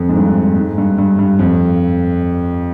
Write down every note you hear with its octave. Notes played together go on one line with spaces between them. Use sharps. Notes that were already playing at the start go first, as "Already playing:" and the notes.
Already playing: F2
G#2
G2
G#2
G2
G2
G2
F2